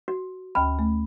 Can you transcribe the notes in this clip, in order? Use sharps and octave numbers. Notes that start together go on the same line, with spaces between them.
F#4
D2 G5 B5 F6
A3